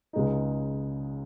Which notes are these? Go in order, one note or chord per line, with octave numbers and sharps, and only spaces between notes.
C#2 C#3 G#3 D#4